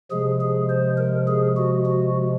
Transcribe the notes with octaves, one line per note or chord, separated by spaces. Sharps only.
C3 F3 G#3 G#4
G#4
C5
A#4
G#4
F#4
F#4